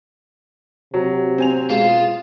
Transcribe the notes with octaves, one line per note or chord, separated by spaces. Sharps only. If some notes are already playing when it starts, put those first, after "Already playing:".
C3 F#3
C4 G#5 F7
B2 G#3 F4 E7